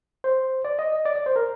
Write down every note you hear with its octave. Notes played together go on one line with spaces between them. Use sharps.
C5
D5
D#5
D#5
D5
D5
C5
A#4